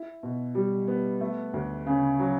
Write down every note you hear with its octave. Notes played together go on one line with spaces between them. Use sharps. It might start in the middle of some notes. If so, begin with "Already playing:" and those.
Already playing: E4
B2
G3
B3
A3
D2
C#3
F#3